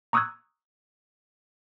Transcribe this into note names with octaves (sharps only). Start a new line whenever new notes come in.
A#5 C#6 D#6 E6 F#6 G#6